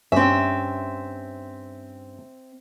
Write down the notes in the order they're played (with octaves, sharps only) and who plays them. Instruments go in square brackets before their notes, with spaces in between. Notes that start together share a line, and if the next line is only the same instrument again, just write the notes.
[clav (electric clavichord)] G2 C#4 [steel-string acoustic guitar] C4 E5